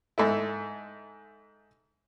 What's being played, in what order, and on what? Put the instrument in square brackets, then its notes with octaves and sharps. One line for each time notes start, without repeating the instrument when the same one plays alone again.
[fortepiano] G#2 A3 E4